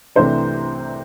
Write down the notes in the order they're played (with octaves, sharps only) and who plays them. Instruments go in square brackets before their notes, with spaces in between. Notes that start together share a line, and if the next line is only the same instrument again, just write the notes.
[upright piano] C2 C3 E3 A3 D4 C5